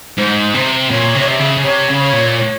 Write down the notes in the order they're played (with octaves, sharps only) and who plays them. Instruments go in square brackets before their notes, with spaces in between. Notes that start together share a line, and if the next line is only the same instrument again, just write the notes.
[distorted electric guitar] G#2 [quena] C5
[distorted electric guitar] C3
[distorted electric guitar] A#2 [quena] C#5
[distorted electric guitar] C3
[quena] C#5
E5
[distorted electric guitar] C#3
C#3
[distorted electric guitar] C3 [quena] C#5
[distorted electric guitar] C#3
[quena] C#5
[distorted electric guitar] A#2
[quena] C#5